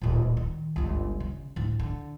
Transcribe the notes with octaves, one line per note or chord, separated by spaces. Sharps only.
D1 A#2
D#3
G1 C#2
C#3
D2 A2
D3